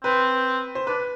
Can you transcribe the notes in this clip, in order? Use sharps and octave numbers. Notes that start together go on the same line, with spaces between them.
C4 B4
C5
D4 B4